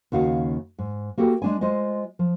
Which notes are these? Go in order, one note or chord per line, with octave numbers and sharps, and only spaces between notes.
D#2 C#3 F#4 F5
G#2
A#3 F#4 G4 A4
G#3 D4 G#5
G#3 F4 C5 D#5
F3